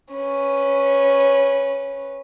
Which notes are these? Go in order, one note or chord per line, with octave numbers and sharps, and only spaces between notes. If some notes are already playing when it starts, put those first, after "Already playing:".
C#4 B4